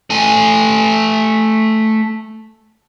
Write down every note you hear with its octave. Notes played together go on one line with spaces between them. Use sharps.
A3 G#5